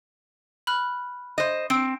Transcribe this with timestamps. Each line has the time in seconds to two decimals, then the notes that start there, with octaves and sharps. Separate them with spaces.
0.67 B5 F6 F#6
1.38 C5 D#5
1.70 C4 D7